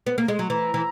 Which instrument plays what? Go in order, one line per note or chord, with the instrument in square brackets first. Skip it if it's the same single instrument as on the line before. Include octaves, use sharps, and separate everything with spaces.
[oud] B3
A#3
G#3
F#3
[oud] E3 [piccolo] A#5
[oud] E3